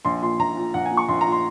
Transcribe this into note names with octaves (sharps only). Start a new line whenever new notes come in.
A#1 C6
A#2 C6
A#1 A#5
A#2
A#1 F#5
G#5
A#2
C#6
A#1 C6
A#5
A#2
C6